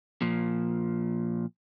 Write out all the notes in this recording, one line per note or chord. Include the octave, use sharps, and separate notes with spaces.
A#2 F3